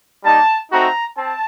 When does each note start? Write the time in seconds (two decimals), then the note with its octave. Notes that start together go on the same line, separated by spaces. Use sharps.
0.24 G3 A#3 D#4 A5
0.70 A3 C4 D#4 F#4 A#5
1.17 C4 A5